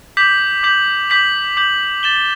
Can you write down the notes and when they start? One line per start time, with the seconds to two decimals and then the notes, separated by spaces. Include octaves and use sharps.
0.17 D6 G6 B6 F#7
0.63 D6 G6 B6 F#7
1.10 D6 G6 B6 F#7
1.57 D6 G6 B6 F#7
2.03 A6 E7 G7